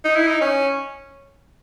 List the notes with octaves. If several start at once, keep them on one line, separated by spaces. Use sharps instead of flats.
D#4
E4
D#4
C#4